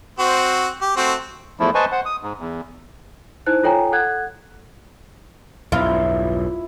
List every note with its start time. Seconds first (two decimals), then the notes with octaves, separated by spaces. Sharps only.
0.19 C4 F#4 C5
0.82 G4
0.97 A3 C4 F#4
1.60 E2 F3 A3 E4
1.75 B4 C5 D#5 G#5 A5 C#6
1.92 C5 F#5
2.06 D#6
2.23 G#2
2.39 E2
3.46 D#4 E4 C5 F#6
3.64 F4 A4 C#5 G5 G#5 A#5
3.92 A4 F#5 F#6 G#6
5.72 B1 E2 G2 E4 F4